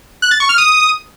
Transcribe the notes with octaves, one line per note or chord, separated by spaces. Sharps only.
F#6
A6
C#6
F6
D#6